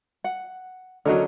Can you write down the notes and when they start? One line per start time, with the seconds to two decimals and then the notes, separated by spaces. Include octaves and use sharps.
0.24 F#5
1.05 D3 F#3 C#4 A#4 D#5